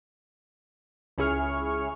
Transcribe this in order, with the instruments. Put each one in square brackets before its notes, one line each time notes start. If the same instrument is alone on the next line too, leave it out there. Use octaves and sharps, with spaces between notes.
[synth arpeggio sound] C#2 C#4 E4 G#4 C#6 F6